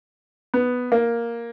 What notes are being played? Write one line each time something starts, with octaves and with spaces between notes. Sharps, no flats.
B3
A#3